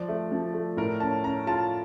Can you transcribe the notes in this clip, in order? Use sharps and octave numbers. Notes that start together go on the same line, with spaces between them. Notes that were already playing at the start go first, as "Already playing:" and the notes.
Already playing: F3 D5
A3
F3
A3
A2 A#4
C#4 A5
C#4 A#5
F4 A5